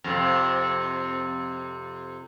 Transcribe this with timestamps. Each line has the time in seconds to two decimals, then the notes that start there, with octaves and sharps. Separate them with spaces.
0.04 F2 C3